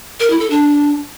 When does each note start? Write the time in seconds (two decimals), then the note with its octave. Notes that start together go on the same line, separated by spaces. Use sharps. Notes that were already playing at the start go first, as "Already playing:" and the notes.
0.20 A#4
0.30 E4
0.40 A4
0.50 D4